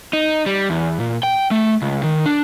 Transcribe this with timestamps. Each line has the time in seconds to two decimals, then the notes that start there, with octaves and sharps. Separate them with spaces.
0.13 D#4
0.46 G3
0.70 E2
1.00 A#2
1.23 G5
1.51 A3
1.82 C#2
2.03 D#3
2.26 D4